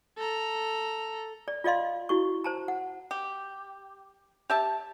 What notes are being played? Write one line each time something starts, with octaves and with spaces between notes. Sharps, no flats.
A4 A#5
D5
F4 D5 D#5 F5 C6
E4 F#4 C#6
C5 A5 A#5
F#5
G4
G4 E5 A5